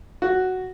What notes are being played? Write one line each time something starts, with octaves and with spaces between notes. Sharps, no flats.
F#4